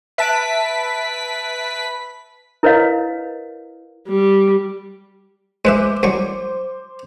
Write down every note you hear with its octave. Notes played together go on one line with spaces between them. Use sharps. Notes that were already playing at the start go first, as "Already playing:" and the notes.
B4 E5 A5 B6 D7
E4 A#4 B4 C#5 D#5 F5
G3
G#3 B4 C5 E5 D6
C2 F#3 C#6